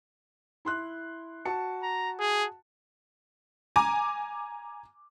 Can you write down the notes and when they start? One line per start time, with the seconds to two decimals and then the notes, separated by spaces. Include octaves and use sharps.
0.65 E4 C6 F#6
1.45 F#4 A5 C#7
1.83 A#5
2.19 G#4
3.76 G#5 A#5 D6